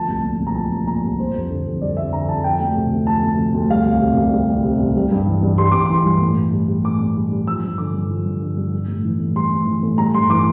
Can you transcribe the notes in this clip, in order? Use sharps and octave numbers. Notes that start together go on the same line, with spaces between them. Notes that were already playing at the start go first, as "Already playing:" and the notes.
Already playing: D2 F3 A5
C2
A#2
C2
A#5
F3 A5
C2
A#2 A#5
C2
G3 C5
F2
D3
F2
G3 D5
F2 E5
D3 A#5
F2 A5
F3 G5
D2
C3
D2
F3 A5
D2
C3
D2
G3 F5
C2
C3
C2
G3
C2
C3
C2
G3
G2
E3
G2
G3 C6
G2 D6
E3 C6
G2
A2
A2
G3
G3
A2 D6
A2
G3
G3
F3 E6
G2
D3 D6
G2
F3
G2
D3
G2
G3
A2
E3
A2
G3 C6
A2
E3
A2
G3 A#5
G2 C6
E3 D6